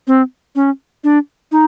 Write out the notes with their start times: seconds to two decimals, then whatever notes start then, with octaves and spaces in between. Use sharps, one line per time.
0.07 C4
0.56 C#4
1.04 D4
1.52 D#4